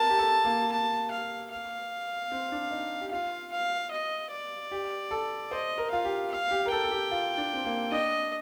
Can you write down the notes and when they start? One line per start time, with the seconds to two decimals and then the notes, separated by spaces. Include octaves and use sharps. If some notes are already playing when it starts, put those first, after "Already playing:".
Already playing: A#4 A5
0.10 G4
0.19 A4
0.44 A#3
0.72 A5
1.11 F5
1.51 F5
2.32 C4
2.52 D4
2.71 D#4
3.01 G4
3.11 F4 F5
3.52 F5
3.91 D#5
4.31 D5
4.71 G4
5.11 A4
5.51 C5 D#5
5.78 A#4
5.91 F4 F5
6.05 G4
6.31 F5
6.51 G4
6.66 A#4
6.71 A4 G5
6.83 A4
6.91 G4
7.11 F4
7.38 D4
7.54 C4
7.65 A#3
7.91 D4 D#5